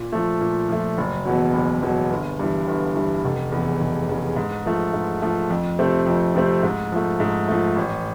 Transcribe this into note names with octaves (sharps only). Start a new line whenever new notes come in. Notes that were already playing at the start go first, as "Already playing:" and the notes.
Already playing: A#2
F3 A3
A#2
F3 A3
F#1
E2 B2 F#3
F#1
E2 B2 F#3
G1
G2 E3
G1
G2 E3
F1
E2 C#3
F1
E2 C#3
G#2
F3 A3
G#2
F3 A3
F2
C3 F3 A3 C4
F2
C3 F3 A3 C4
G#2
F3 A3
G#2
F3 A3
A1